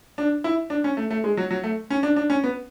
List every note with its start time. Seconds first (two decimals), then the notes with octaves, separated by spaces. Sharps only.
0.18 D4
0.44 E4
0.70 D4
0.84 C#4
0.97 A3
1.11 A3
1.24 G#3
1.37 F#3
1.51 F#3
1.63 A3
1.90 C#4
2.03 D4
2.16 D4
2.30 C#4
2.44 B3